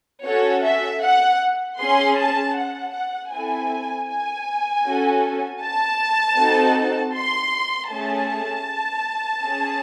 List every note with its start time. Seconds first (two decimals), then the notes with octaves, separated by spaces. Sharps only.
0.25 C#4 F#4 A4 C#5
0.63 E5
1.02 F#5
1.79 C#4 G#4 C6
2.17 A5
2.56 F#5
2.93 F#5
3.31 C4 E4 A4 G#5
4.08 G#5
4.85 C#4 F#4 A4
5.62 A5
6.38 C4 D#4 F#4 A4
7.14 C6
7.91 A3 C#4 G#4 A5
9.44 C#4 G#4